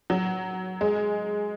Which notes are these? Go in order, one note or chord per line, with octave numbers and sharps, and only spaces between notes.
F#3
G#3